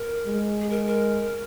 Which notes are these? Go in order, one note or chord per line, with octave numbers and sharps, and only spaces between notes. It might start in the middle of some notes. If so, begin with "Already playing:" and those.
Already playing: A#4
G#3
G#4
A#4
A#4